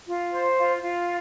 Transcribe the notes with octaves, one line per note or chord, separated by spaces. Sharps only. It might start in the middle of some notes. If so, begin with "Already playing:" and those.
F4
C5
F4
F4